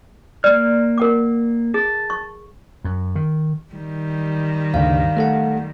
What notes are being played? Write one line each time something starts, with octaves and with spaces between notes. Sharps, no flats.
A#3 D5 F6
A#4 F#5 D6
G#4 A5
C#6
F#2
D#3
D#3 G3
D2 G2 C#3 F5
A3 A4 F#5